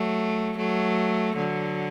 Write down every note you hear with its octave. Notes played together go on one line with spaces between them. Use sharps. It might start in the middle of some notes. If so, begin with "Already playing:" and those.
Already playing: F#3 A3
F#3 A3
D3 F#3